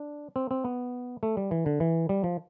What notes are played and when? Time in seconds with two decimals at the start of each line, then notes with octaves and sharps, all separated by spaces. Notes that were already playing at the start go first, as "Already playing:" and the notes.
Already playing: D4
0.36 C4
0.51 C4
0.65 B3
1.23 A3
1.37 G3
1.51 E3
1.66 D3
1.80 E3
2.09 G3
2.24 F3